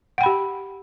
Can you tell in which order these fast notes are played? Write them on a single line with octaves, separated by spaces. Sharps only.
F#5 G5 B5 G4